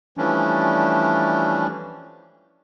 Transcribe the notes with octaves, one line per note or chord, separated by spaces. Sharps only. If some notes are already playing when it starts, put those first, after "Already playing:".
E3 F3 G3 A3 C#4 D4